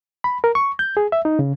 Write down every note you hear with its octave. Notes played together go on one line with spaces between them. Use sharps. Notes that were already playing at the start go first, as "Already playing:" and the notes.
B5
A#4
C#6
G6
G#4
E5
D#4
C#3